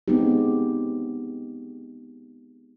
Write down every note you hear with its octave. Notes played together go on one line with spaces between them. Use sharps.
G#3 B3 C4 D#4 G4